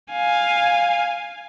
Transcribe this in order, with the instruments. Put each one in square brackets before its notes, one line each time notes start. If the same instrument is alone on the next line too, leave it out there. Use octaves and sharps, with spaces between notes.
[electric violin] F5 G#5